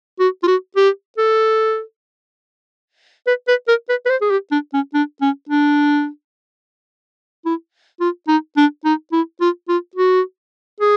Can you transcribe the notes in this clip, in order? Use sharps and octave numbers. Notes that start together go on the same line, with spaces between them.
F#4
F4
F#4
G4
A4
B4
B4
A#4
B4
B4
C5
G#4
G4
D4
C#4
D4
C#4
D4
E4
F4
D#4
D4
D#4
E4
F4
F4
F#4
G#4